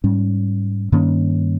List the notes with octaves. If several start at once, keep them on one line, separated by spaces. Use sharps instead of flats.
G#2 G3 C#4
G2 D#3 A#3 C#4